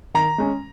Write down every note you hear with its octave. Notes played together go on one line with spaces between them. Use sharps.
D#3 A#5
G#3 C#4